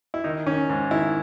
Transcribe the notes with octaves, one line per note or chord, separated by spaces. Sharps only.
E4
D#3 D#4
D#3 C#4
G#2
D#3 E4